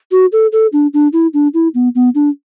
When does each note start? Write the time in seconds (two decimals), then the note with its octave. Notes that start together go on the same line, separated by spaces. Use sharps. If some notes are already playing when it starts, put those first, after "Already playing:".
0.12 F#4
0.33 A4
0.52 A4
0.73 D4
0.94 D4
1.13 E4
1.34 D4
1.54 E4
1.74 B3
1.95 B3
2.15 D4